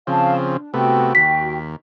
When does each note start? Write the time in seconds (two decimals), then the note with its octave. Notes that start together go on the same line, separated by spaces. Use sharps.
0.07 C#3 F3 C4 F5 A5
0.49 D4
0.74 C3 A3 B3 F#4 G5
1.15 D#2 B6